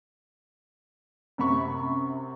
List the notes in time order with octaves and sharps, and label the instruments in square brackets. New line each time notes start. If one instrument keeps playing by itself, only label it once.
[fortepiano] F#2 C3 B5 C#6